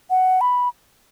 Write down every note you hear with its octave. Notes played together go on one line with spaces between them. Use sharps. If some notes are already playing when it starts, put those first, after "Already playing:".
F#5
B5